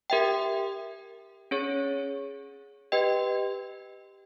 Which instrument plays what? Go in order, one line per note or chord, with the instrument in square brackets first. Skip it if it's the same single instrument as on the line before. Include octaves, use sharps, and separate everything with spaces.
[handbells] G4 A#4 E5 G5
C#4 G#4 C#5
G4 B4 D#5 G5